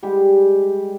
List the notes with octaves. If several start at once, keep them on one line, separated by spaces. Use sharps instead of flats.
G3 G#3 G4